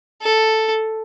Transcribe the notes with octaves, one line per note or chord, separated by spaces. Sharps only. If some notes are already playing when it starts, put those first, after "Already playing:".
A4